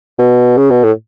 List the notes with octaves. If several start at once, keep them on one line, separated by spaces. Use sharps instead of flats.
B2
C#3
B2
A2